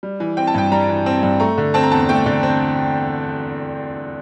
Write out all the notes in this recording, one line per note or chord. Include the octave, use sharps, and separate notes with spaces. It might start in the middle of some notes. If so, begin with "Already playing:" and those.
G3
E3
C4 G5
A5
G2 G5
G3 A#5
E3
C4
G2
A3 A#5
D3
C4 A5
A#5
E2 A5
A3 G5
D3
C4